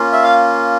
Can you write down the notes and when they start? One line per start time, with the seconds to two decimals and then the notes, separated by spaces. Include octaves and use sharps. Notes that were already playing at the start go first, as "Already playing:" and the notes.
Already playing: A#3 C#4 F4
0.13 E5
0.24 F5